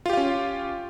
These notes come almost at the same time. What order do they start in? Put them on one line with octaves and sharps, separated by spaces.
F4 G4 F5 C#4